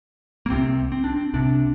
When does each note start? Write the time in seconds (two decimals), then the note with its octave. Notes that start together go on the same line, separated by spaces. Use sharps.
0.46 A#3
0.50 C2 C3 C4
0.92 C4
1.04 D4
1.16 C4
1.34 C2 C3 D4